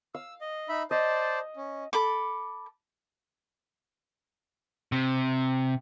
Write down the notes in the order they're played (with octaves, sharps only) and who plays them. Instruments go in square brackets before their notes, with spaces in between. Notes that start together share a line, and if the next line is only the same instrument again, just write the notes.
[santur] F5 [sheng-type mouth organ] E6
[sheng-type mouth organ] D#5
D#4 E5 B5
[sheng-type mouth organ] C5 D5 A5 [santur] D#5
[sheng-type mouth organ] C#4
[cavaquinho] A4 B5 D6
[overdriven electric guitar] C3